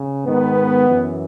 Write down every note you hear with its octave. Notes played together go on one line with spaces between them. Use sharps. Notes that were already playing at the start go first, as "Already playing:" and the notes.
Already playing: C#3
G#2 D#3 B3
F#2 E3